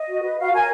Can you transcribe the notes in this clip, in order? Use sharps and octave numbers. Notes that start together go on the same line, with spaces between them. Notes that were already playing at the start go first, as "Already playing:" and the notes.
Already playing: D#5
F#4
B4
F#4 F5
A#4 C#5 G#5